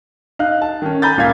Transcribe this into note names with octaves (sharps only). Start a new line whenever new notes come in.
D#4 F5 F#6
A5
D#3 C#4
G#5 A#5 B5 G6 A6
C#2 A#2 A#3 F5 G#6 B6